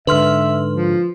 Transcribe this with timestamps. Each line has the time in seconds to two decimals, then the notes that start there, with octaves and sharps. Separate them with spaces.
0.07 G#2 D3 B4 E5 C6 F6
0.69 F3